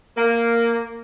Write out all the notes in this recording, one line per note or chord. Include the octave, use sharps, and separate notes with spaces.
A#3